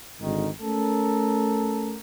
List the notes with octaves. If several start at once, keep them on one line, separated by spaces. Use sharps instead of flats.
G#1 D3 D#3
A3 C#4 A4 A#4